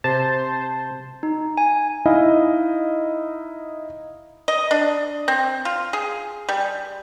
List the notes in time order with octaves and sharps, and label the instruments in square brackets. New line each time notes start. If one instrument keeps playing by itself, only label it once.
[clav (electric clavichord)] C3 [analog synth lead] C5 [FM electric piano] A5
[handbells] D#4
G#5
[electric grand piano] D#4 E4 D#5 F5
[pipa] D#5
D4
C4
F4
G#4
G3